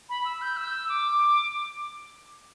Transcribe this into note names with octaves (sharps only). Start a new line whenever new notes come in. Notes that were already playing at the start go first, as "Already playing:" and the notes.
B5
E6
G6
E6
D6